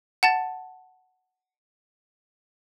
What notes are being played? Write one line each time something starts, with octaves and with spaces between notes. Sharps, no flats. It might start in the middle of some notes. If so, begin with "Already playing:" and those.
F#5 A5 A6